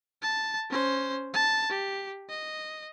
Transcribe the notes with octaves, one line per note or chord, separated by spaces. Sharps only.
A5
C#4 C5
A5
G4
D#5